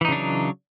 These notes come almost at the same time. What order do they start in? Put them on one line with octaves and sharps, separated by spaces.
E3 D#4 C#3 D4 F#3